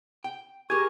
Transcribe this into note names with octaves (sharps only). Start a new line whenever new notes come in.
G5
G4 G#4 A#4 G#5 C#6